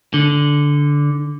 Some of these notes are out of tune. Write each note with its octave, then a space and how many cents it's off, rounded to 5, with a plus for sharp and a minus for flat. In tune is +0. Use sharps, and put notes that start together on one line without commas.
D3 -10